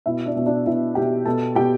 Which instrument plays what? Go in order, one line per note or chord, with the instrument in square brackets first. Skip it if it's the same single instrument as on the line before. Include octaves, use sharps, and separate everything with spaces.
[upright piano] B2 E4 E5
D4 D5
B2
D4 D5
B2 E4 E5
B2 G4 G5
B2 A4 A5
B2 G4 G5